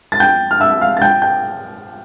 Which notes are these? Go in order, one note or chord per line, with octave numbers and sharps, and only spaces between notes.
A6
G5 G6
F6
E5 E6
F5 F6
A6
G5 G6
G5 G6